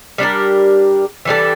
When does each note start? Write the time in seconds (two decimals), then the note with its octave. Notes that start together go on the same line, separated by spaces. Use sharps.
0.18 G3 D4 G4 A#4
1.25 E3 G3 D4 A4